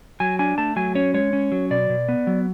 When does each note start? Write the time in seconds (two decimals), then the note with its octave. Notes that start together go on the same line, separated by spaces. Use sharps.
0.20 F#3 G#5
0.39 D4 G#5
0.58 A3 A5
0.76 F#3 G#5
0.95 C#4 C#5
1.14 G#3 C#5
1.33 C#4
1.52 F#3
1.70 B2 D5
1.90 B2
2.09 B3
2.27 F#3